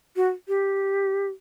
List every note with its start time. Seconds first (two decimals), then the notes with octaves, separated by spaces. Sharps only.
0.16 F#4
0.48 G4